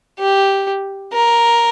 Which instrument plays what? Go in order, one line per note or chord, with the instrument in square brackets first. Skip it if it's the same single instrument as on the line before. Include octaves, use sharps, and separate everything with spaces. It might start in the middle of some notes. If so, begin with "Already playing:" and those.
[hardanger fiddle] G4
A#4